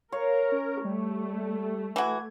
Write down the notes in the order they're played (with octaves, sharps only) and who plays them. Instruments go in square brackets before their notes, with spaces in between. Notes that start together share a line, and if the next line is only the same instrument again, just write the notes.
[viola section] A#4 [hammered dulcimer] C#5 [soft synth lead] F5
[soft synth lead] C#4
[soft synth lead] G3 [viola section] A3
[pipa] E3 F#4 [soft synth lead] G#6